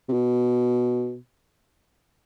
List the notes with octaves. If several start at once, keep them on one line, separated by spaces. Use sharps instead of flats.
C3
B2